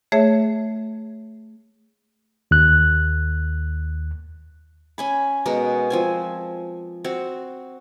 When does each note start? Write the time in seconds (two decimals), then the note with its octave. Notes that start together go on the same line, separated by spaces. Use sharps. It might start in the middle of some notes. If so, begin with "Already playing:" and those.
0.12 A3 G#4 C#5 E5
2.51 D#2 F#6
4.98 C#4 G#5 B5
5.46 B2 G#3 F#4 A#4
5.90 F3 C4 G#5
7.04 C4 F#4